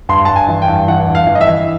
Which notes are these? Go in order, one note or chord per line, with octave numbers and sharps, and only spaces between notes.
G2 C6
G2 A5
G#5
E3
G5
G2
E3 F#5
G2
F5
E3
D#5
E5
E3